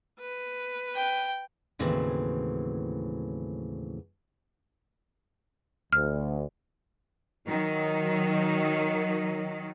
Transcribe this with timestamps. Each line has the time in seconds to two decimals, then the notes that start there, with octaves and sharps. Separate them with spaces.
0.20 B4
0.96 G5
1.79 D#2 A2 C#3 E3 F#3 C4
5.93 D2 F6
7.48 D#3 F#3